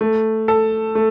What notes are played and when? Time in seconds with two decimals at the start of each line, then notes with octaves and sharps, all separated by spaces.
0.01 A3
0.48 A4
0.95 A3